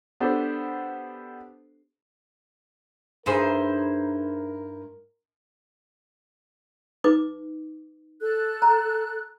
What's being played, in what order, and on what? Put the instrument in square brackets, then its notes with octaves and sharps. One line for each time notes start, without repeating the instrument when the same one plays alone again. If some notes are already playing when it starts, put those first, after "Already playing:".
[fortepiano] B3 D4 G4 A4 C5
[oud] G2 G#4 [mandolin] D#4 E4 C5 [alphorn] A#4
[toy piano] D#4 B4 D6
[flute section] A4 F#6
[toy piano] A#5